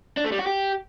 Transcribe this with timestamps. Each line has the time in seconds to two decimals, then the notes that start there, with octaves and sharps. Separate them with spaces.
0.17 D4
0.24 A3
0.32 G3
0.39 F#4
0.46 G4